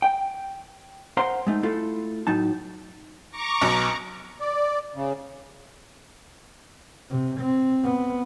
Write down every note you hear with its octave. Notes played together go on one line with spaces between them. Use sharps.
G5
A#4 C5 F5 F#5 A#5 C6
G#3 A3 D#4
A3 E4 F4 A4
A2 F#3 D#4 A5
A#5 C#6 D6
B1 B2 F#3
D5
C#3
C3
C4
B3